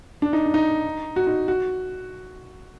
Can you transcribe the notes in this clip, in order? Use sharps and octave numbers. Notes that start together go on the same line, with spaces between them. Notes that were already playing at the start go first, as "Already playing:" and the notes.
D4
D#4
D4
D#4
F#4
D#4
F#4